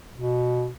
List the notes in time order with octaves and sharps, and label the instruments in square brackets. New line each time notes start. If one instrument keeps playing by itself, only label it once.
[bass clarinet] B2